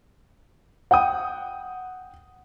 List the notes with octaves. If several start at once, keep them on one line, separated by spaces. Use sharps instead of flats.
F#5 G5 D#6